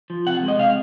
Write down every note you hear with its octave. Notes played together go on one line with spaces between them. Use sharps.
F3
C3 F#5
G#3
D#5
C3 F5